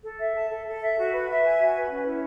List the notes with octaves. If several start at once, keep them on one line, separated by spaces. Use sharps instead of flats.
A4
E5
A5
A4
A4
E5
F#4
B4
E5
G#5
F#4
B4
C#4
E4